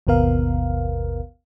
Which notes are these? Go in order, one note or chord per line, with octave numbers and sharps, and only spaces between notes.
G#1 D#2 B2 B3 A#4 F5